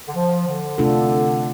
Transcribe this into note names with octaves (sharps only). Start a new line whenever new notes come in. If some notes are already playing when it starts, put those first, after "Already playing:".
D3
F3
D3
C3 A3 D4 F4 A4